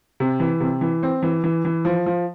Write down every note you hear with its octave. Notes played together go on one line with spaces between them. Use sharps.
C3
E3
C3
E3
C4
E3
E3
E3
F3
F3